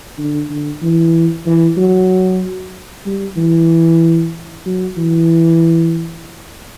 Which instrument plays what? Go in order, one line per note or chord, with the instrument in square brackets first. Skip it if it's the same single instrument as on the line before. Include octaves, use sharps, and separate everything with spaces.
[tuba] D3
D3
E3
E3
F#3
G3
E3
F#3
E3